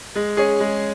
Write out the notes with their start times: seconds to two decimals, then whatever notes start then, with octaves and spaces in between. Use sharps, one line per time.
0.15 G#3
0.37 C#4 G#4
0.60 G#3